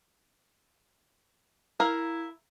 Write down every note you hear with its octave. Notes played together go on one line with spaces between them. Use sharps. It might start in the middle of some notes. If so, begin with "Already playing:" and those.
E4 A#4 F5